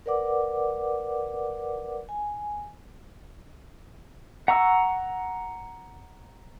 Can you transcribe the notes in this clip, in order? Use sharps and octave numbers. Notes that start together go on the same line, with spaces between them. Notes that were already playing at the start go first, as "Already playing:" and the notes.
A#4 B4 D5 F#5 D6
G#5
F#5 A#5 C#6 E6